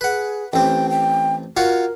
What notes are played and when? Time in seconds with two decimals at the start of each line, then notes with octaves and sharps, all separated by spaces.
0.01 G#4 B4 F#5
0.53 A1 C4 G5
0.90 G5
1.57 F4 F#4 A#4 C#5